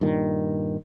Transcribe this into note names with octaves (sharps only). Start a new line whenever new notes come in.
G2 A#2 D#3